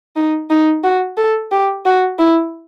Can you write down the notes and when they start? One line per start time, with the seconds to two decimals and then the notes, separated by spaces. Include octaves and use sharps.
0.16 D#4
0.50 D#4
0.84 F#4
1.17 A4
1.52 G4
1.86 F#4
2.19 E4